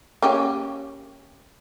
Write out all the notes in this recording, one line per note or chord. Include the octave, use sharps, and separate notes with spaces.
A#3 C#4 G4